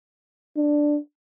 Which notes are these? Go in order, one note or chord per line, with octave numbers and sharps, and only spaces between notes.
D4